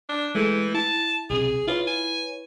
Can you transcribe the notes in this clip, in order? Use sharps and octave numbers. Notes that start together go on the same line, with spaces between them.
D4
E3 G#3 A3 G6
E4 A5
B1 C3 G#4
E4 F4 B4 C#5
G#5